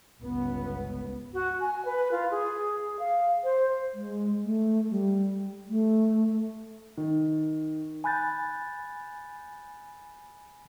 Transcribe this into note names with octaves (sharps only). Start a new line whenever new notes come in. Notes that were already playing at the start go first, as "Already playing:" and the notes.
G1 C#2 B3
F#4
G#5
B4
F4
G#4
F5
C5
G#3
A3
G3
A3
D#3
G#5 B5 F#6 G6 A6